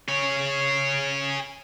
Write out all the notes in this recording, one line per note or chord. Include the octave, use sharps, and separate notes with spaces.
G#4 C#5